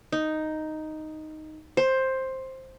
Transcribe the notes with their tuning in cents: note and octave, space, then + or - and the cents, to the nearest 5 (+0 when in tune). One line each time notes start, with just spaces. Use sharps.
D#4 +0
C5 +10